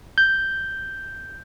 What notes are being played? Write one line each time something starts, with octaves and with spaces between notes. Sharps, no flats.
G6